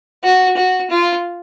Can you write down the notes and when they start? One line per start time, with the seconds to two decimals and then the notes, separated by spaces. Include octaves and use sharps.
0.24 F#4
0.57 F#4
0.90 F4